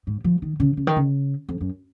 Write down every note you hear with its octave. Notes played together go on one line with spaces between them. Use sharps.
G#2
F3
D#3
C#3
C#3
D#3
C#3
F2
F#2